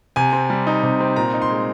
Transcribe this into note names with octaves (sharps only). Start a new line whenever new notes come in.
C3 G#5
C4
G3
D#4
C3
C4
A#2 A#5
D#4
C6
G#3